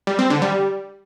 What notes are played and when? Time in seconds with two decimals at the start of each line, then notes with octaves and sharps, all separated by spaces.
0.07 G3
0.19 C4
0.30 D3
0.42 G3